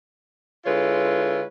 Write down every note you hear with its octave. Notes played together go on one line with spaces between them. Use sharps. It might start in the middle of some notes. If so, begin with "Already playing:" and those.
D3 G#3 E4 F4 B4 C#5